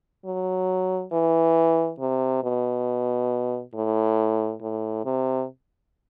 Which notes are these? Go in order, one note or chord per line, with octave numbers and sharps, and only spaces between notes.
F#3
E3
C3
B2
A2
A2
C3